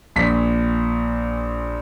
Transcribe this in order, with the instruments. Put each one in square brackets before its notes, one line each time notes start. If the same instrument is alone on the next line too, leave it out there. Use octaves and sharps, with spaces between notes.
[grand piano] A#1 A#2 B6